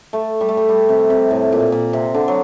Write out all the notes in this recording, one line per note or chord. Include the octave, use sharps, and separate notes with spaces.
A3
G3
A3
G3
G3
C3
C3
A2
A#2
A#2
C3
D3
F#3